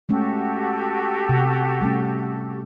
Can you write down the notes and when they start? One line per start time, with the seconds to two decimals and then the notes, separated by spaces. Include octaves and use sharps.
0.09 G#3 A3 C#4 F#4 G4 A4
1.29 C3
1.81 G3 A3 C#4